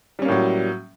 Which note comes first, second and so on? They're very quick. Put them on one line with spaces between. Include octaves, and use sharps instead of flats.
G3 C#4 A#3 A2 F#3